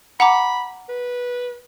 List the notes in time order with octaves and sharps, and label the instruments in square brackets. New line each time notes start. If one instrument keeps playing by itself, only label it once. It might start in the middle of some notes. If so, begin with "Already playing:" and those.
[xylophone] F#5 A#5 D6 [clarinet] B5
[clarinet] B4